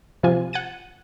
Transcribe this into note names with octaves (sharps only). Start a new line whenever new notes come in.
C3 F3 F4 G#5
F#5 G#6 A6 D#7